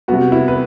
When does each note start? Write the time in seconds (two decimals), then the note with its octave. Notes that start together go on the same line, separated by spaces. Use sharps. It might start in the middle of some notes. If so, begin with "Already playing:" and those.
0.08 C3 G3 B3 F#4
0.32 E4
0.48 B4